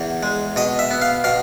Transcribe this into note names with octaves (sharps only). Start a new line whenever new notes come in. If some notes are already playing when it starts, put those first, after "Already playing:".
Already playing: E2
G#3
B2 D#5
E5
B3
F5
B2 F5